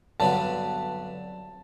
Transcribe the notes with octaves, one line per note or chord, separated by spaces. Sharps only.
G2 D3 F#3 B3 A5